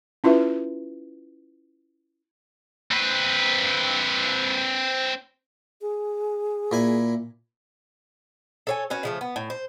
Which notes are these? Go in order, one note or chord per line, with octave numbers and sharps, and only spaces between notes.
C#4 E4 F4 B4 E5
C4 B4
G#4
A#2 E4 G#5
A4 C#5 G#5
C#4 F#4 B4
C#3 F3 A3
B3
A2
C5